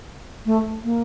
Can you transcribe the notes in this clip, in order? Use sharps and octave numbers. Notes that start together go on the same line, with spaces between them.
A3
A#3